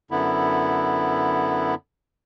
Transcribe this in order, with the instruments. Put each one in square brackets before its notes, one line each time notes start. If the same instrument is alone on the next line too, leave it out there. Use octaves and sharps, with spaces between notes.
[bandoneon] F#2 D3 B3 E4